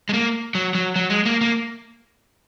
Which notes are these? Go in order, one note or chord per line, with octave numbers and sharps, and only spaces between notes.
G#3
A#3
F#3
F#3
F#3
G#3
A#3
A#3